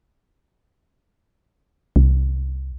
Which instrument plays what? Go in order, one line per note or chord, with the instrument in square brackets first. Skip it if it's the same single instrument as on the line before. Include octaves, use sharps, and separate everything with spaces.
[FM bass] C2